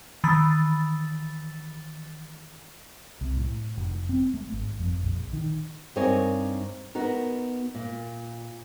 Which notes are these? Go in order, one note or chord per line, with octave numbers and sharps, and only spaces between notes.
D#3 E3 B5 A6
C2
A2
F1
C4
A3
G#1
F2
A#1
D#3
G2 C4 D#4 A#4 C#5 G#5
B3 D#4 F#4 A#4
A#2